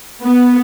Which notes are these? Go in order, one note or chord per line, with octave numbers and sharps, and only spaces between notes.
B3